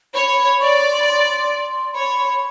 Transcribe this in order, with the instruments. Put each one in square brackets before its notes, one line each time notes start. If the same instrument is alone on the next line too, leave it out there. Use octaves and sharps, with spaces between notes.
[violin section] C#5 [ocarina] B5
[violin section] D5 [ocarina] C#6
[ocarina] C#6
C6
B5
C6
[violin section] C#5 [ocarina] B5